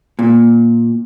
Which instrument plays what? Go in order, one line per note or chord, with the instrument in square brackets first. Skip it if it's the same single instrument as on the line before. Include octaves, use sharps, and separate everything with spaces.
[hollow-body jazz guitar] A#2